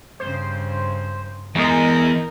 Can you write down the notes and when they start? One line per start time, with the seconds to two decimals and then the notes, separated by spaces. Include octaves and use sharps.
0.20 G2 C#3 C5
1.55 E2 G#3 D#4 A#4